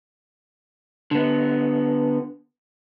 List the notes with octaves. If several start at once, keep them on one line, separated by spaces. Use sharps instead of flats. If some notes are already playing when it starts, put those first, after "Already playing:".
D3 B3